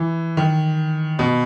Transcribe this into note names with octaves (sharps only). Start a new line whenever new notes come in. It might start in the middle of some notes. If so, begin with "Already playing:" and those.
Already playing: E3
D#3
B2